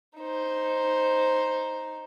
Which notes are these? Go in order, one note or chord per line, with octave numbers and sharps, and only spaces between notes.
D#4 C5